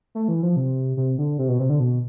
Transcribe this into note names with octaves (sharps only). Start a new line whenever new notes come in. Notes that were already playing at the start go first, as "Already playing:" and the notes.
A3
E3
F3
C3
C3
D3
C3
B2
C3
D3
B2